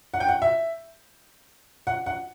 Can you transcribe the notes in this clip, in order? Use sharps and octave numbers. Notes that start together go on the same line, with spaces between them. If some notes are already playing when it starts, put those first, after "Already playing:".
F#5
G5
F#5
E5
F#5
F#5